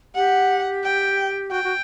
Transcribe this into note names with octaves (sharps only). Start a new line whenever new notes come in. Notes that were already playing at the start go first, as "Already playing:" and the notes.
G4 F#5
G5
F#4 G5
F#4